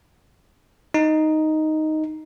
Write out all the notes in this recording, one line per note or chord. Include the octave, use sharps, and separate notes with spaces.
D#4